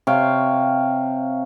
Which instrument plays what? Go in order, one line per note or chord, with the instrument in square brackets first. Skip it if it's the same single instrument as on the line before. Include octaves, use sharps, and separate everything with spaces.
[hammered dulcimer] C3 C#5 F5 G5